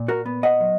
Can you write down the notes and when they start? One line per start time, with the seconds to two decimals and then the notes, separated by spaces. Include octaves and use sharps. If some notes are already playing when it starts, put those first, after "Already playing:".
Already playing: A#2
0.08 F#4 A#4
0.26 B3
0.43 D#5 F#5
0.60 F#3